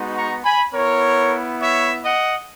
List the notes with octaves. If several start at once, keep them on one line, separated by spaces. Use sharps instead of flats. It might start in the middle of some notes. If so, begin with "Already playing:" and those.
Already playing: G#3 B3 D#4 F#4
A#5 C#6
G#5 B5
B3 E4 A#4 C#5
C#5 E5
D#5 F#5